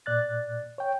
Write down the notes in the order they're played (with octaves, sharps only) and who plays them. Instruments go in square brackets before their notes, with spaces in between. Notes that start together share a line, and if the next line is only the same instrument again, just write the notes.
[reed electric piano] A#2 D5 F#6 A6
C#5 G5